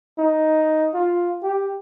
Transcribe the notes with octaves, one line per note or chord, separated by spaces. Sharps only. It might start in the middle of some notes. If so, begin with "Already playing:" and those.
D#4
F4
G4